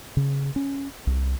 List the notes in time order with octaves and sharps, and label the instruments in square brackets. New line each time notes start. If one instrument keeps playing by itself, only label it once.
[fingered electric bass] C#3
C#4
C2